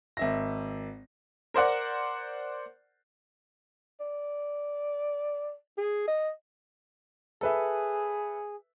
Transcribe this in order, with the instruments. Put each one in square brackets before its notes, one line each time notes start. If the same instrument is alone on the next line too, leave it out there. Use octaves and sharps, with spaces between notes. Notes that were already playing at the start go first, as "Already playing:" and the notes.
[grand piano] G#1 E5 A#6
[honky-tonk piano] A#4 C5 D5 F#5
[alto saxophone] D5
G#4
D#5
[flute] G#4 [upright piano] A4 B4 E5